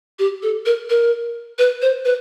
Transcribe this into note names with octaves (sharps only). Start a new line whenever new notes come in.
G4
A4
A#4
A#4
B4
C5
B4